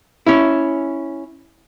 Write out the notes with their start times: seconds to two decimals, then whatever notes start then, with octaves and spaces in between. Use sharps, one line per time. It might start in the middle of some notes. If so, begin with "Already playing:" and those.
0.26 C#4 E4